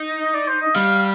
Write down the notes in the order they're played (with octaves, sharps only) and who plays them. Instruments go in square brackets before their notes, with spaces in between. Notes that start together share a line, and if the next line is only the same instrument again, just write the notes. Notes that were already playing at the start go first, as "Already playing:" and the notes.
Already playing: [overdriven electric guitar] D#4
[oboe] D#5
D5
C5
D#5
[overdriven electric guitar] G3 [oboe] F5